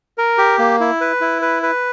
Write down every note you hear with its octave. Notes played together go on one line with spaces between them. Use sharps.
A#4
G4
A#3
E4
B4
E4
B4
B4